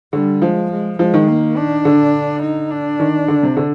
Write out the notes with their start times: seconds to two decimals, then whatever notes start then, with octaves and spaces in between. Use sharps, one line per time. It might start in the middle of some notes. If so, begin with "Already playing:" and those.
0.13 D3 G3
0.42 F3 G#3
0.71 G#3
0.99 F3 G#3
1.14 D#3
1.28 A#3
1.57 D4
1.85 D3
2.42 D#4
2.71 D4
2.99 D#3
3.28 D3
3.43 C3
3.57 D3